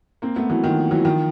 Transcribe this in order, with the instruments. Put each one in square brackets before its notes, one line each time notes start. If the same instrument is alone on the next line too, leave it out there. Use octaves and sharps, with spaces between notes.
[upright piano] A#3 C4
A3 B3
E3 F#3
D#3 F3
E3 F#3
D#3 F3